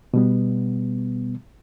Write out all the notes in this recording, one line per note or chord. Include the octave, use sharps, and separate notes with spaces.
B2 G3 B3